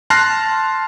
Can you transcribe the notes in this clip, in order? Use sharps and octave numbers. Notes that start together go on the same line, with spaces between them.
A5 C6 F6 F#6 A#6 C7